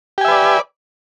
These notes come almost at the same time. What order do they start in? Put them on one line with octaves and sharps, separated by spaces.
G4 G#5 E5 B4 D5